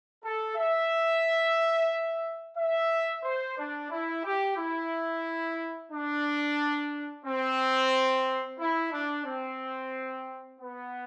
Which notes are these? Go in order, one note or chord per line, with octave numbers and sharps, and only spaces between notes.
A4
E5
E5
C5
D4
E4
G4
E4
D4
C4
E4
D4
C4
B3